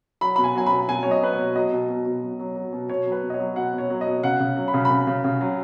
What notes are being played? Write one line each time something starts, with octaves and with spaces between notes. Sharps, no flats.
F#3 B5
B2 B5
G#5
F#3 G#5
B5
B2
B2 G#5
F#3 C#5
D#5
F#3 B4
C#5
B2
F#3 D#5
B2
B2
B2
F#3
F#3
F#3
B2
B2 C#5
F#3
B4
B2
D#5
C#5
F#3
B2 F#5
B2
C#5
F#3
D#5
B2
C#3 F#5
C#3
F#3
B5
C#3
B5
C#3
C#3
C#3
F#3